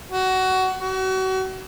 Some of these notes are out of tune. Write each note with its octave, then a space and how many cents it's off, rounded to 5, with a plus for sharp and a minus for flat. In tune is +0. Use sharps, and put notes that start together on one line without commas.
F#4 +20
F#4 +35